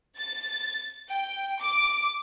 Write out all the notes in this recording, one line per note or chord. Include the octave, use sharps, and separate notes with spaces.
A6
G5
D6